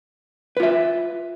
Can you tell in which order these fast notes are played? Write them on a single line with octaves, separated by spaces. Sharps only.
B4 F4 E5